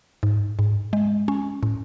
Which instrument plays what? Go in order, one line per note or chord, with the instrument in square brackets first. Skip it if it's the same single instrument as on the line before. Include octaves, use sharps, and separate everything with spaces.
[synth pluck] G#2
G#2
G#3
C#4
A2